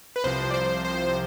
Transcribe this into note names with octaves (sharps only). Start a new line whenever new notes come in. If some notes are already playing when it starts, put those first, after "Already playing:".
B4
C2 C3 F3 C5
D5
C5
C5